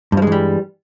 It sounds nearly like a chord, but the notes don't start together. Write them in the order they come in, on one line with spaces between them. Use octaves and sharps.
G2 F3 G#3 E3 G3